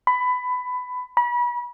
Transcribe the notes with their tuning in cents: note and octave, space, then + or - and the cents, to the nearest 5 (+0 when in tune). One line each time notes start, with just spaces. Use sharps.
B5 +15
B5 -35